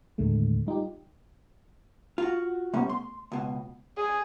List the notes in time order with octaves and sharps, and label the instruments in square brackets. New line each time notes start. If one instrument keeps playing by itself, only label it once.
[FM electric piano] D#2 A2 D3 G#3 A3
G3 D#4 F4 G4
[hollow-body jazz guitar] F4 F#4
[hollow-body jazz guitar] C3 G3 C#4 [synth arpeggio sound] A3 B3
[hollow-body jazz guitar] C6
C#2 B2
[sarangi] G#4